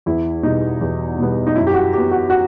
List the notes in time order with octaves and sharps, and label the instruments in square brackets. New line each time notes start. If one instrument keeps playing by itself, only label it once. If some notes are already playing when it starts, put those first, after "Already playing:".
[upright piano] E2 E4
B2 G3 B3 D#4
E2
B2 G3 B3
D#4
F#2 E4
G4
F#4
F#3 B3 G4
F#4
F#4